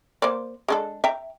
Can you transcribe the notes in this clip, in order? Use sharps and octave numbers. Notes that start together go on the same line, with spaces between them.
A#3 C5 D5
G#3 D4 A4
E5 G5 A#5